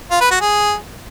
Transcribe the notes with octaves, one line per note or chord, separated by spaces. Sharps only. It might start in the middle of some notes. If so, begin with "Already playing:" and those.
F4
B4
F#4
G#4